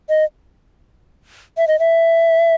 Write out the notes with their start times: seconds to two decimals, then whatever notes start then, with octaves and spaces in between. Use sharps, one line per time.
0.09 D#5
1.58 E5
1.68 D#5
1.79 E5